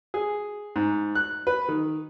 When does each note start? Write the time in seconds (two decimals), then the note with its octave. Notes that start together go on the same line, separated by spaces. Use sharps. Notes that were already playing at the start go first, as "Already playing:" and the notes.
0.14 G#4
0.76 G#2
1.15 F#6
1.47 B4
1.69 D#3